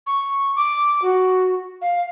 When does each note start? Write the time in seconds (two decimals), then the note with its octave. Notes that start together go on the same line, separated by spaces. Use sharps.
0.07 C#6
0.56 D6
1.02 F#4
1.82 F5